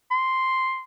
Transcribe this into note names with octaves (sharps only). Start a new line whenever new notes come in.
C6